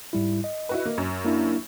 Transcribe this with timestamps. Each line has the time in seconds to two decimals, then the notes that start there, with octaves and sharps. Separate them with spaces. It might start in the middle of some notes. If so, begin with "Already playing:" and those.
0.13 G#2 G3 E4
0.44 D#5
0.69 E4 F#4 B4
0.85 A#3
0.98 F#2
1.25 A#3 D4 E4